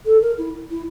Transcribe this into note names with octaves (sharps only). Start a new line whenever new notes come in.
A4
A#4
E4
E4